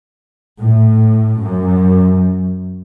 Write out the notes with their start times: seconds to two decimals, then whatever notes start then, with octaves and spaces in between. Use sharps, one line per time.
0.61 A2
1.41 F#2